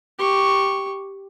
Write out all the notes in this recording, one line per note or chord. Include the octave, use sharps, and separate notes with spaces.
G4 C#6